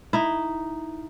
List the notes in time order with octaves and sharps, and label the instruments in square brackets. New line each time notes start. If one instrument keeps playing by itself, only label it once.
[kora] D#4 E4